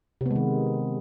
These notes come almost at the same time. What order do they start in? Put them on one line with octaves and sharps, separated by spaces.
C3 B3 G#3 D#3